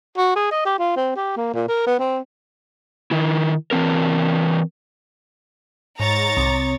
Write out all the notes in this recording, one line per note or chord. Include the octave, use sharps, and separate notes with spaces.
F#4
G#4
D#5
G4
F4
C4
G4
A#3
A#2
A#4
B3
C4
D#3 E4
E3 G#3 C4 A#4
G#2 C#5 A#5 A6
C2